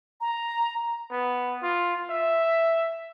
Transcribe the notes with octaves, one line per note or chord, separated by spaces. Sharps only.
A#5
B3
F4
E5